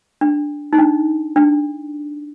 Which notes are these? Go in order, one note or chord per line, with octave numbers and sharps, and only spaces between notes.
D4
D#4
D4
D4